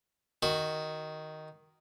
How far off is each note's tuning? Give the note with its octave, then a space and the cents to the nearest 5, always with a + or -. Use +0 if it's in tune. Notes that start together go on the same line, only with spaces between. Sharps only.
D#3 +0 F#4 +0